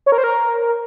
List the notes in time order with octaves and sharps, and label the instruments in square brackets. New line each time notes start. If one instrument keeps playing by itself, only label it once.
[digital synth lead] C#5
A#4
C5
A#4